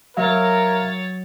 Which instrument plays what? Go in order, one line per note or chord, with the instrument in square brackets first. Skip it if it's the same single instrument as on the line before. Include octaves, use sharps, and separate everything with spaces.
[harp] F#3 [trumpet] A#4 [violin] C#5 A6 [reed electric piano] E5 F5